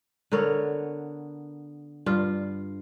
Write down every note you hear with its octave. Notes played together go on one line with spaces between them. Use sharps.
D3 B3 A#4 C#5
G2 F4